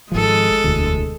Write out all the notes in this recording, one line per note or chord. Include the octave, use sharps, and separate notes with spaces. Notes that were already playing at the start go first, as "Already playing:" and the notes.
G#1 F3 G#3 A4
E1 D2